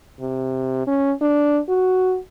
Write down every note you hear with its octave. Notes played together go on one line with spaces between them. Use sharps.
C3
C#4
D4
F#4